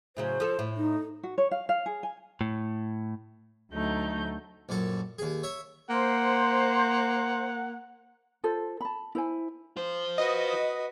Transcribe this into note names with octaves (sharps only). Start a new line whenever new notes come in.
A2 C#3 F#3 C5
F3 A4
A2
D#4
F#4
C#5
F5
F5
G#4
G#5
A2
D2 F#3 A3 D#4 G6
A#1 F#2 A4
D#2 G#4
C#5 E5
A#3 C5 F#5
F4 A4 C5
A5 B5
E4 C5 G#5
F4 C5
F#4 B4 D#5